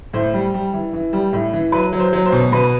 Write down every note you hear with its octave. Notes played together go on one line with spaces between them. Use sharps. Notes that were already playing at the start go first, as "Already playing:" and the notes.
A2 C5
G3
G3
E3
E3
G3
A2
E3
F#3 B4
F#3
C5
F#3
C5
B2
B2 B4